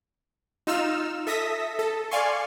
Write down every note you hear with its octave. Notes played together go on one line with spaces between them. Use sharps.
D#4 F4 E6 F6 E7
A4 E5 D#6 A#6 B6
A4
D5 F5 G#5 C6 C#6